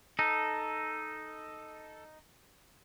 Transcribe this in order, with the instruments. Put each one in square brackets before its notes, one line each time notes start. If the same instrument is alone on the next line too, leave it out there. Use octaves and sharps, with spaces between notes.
[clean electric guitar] D#4 [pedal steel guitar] A4